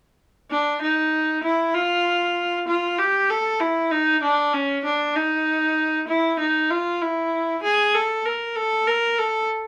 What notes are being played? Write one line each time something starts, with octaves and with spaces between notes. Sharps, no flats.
D4
D#4
E4
F4
F4
G4
A4
E4
D#4
D4
C#4
D4
D#4
E4
D#4
F4
E4
G#4
A4
A#4
A4
A#4
A4